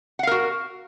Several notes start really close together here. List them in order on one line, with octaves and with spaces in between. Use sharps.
F#5 F5 A#4 F#4